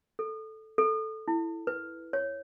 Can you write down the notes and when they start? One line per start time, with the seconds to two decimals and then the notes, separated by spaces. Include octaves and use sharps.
0.19 A4
0.78 A4
1.28 E4
1.67 B4
2.13 C#5